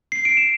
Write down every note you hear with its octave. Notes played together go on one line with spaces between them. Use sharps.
C7
D7
E7